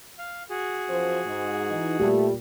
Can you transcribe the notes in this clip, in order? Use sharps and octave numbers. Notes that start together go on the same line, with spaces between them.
F5
F#4 G#4
F#2 F3 C5
G#2
E3 D#4
A#2 G3 A3 G4